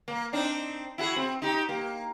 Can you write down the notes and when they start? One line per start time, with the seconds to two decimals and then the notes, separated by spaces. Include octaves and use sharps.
0.08 A#3
0.33 C4 D4 D#4
0.98 E4 F#4 G#4
1.16 C4
1.42 D#4 G4
1.69 A#3